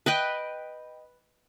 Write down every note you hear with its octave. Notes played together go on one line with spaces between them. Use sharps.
B4 D#5 G5